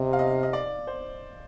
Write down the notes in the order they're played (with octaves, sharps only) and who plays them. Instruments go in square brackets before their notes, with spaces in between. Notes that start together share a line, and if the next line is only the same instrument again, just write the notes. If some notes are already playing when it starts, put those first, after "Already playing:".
Already playing: [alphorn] C3 [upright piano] D#5
[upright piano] F5
D#5
D#5
D5
C5